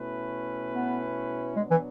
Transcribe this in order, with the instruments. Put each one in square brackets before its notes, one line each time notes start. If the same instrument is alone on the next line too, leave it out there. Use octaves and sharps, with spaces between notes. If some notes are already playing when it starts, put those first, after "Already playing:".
Already playing: [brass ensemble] B2 A3 C#4 E4 B4
[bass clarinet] B3
[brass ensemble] B2 F#3 B3 D4 [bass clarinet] G#3
[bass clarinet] E3